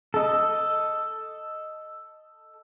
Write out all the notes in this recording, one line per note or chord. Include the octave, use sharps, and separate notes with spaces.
A4 D#5